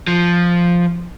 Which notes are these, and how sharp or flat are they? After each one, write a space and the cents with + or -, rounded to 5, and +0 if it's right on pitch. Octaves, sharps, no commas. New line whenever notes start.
F3 +0